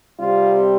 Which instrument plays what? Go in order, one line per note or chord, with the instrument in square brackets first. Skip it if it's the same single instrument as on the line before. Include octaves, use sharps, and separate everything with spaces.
[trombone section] C3 G3 C4 F4